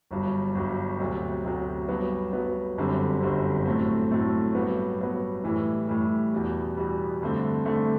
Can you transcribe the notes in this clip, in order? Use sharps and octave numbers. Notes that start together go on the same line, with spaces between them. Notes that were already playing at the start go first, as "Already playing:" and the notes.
G1 G2 F#3
G1 G2 F#3
D2 C3 F#3
D2 C3 F#3
G2 F#3 B3
G2 F#3 B3
G1 F#2 D3 G3 C4
G1 F#2 D3 G3 C4
A2 F#3 A3 C4
A2 F#3 A3 C4
G2 F#3 B3
G2 F#3 B3
A2 E3 G3
A2 E3 G3
E2 B2 G3
E2 B2 G3
G2 D3 A3 C4
G2 D3 A3 C4